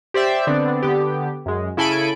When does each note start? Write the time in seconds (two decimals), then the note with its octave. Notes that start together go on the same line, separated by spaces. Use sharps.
0.14 G4 C5 D5 E5
0.47 D3 B3 C4 D4
0.82 D3 B3 G4
1.46 F#2 G#3
1.77 C#3 E4 A4 G#5 B5 D7